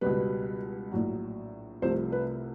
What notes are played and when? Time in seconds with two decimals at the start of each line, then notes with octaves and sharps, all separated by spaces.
0.01 C#2 B2 G3 B4
0.92 A#1 A2 F#3
1.82 C2 C3 F3 A3 C5
2.12 B4